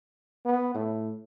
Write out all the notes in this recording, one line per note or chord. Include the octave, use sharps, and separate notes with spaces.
B3
A2